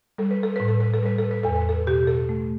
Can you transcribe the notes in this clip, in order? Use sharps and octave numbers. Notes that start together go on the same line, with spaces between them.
G3 A4
B4
A4
A2 B4
A4
B4
A4
G3 B4
A4
B4
E2 A4
B4
A4
B2 G4
A4
A3